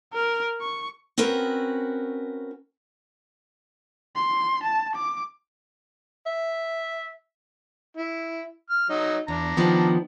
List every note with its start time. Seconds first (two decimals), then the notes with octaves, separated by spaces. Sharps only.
0.14 A#4
0.61 C#6
1.18 C4 C#4 F#4 A#4 B4
4.16 C6
4.63 A5
4.95 D6
6.26 E5
7.97 E4
8.70 F6
8.90 F#3 D#4
9.28 E2 D4 A#5
9.57 D#3 F3 B3